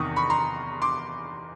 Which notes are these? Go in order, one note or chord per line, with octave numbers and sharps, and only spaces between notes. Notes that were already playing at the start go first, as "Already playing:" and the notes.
Already playing: E2 C3 D#3 C#6 D#6
B5 C#6
A#5 C6
C6 D6